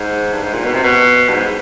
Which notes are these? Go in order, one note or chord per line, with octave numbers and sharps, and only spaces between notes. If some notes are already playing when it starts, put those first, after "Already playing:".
Already playing: G#2
G2
G#2
A#2
B2
C3
B2
G2
G#2